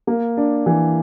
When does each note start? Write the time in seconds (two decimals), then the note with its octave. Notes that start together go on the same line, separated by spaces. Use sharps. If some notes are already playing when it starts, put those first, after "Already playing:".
0.07 A#3
0.37 D4
0.66 E3